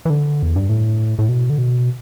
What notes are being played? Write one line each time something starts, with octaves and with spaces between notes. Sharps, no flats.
E3
D3
E2
G2
A2
A2
B2
D3
B2